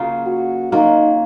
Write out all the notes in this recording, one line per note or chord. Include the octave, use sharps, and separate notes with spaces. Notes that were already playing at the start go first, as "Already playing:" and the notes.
Already playing: C#3 F#3 A#3 F4
F#4
F#3 A#3 D#4 F4